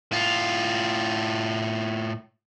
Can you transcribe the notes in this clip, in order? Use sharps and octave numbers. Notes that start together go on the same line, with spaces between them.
A2 F4